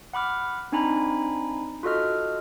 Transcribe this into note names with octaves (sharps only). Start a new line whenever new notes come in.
F#5 B5 D6 F6
C4 D4 D#4 G#5 A#5 B5
F4 F#4 A4 D#5 F6